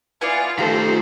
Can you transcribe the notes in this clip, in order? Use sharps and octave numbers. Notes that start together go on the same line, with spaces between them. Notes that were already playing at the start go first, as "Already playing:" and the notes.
B3 E4 F4 D5 G#5
D#3 A3 F4 G4 A4 C5 A#5